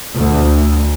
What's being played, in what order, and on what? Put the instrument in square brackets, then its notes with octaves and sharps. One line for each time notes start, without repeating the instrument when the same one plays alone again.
[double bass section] D2